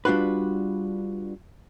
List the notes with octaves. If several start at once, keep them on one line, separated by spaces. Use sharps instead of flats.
G3 D4 F4 F#4 B4